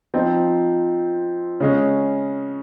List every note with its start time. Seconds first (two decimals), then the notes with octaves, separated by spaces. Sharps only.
0.14 F3 C4 D#4
1.60 C#3 G#3 C#4